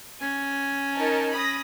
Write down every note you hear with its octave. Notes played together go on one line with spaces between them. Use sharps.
C#4 G#5
D#4 A#4 A5
B5 D#6 A#6